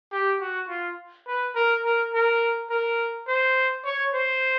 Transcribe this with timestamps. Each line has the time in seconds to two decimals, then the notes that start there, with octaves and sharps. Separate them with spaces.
0.12 G4
0.41 F#4
0.69 F4
1.27 B4
1.55 A#4
1.85 A#4
2.14 A#4
2.70 A#4
3.28 C5
3.85 C#5
4.14 C5